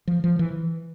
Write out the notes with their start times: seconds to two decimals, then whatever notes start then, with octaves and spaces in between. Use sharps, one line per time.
0.07 F3
0.24 F3
0.39 E3